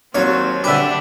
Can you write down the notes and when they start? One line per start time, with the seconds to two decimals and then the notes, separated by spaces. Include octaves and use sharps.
0.15 D#2 F#3 C4 C#5
0.64 D3 D4 G4 B4 E5